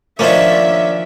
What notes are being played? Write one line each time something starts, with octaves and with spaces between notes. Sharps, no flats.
D#3 F3 A#3 C#4 D4 E5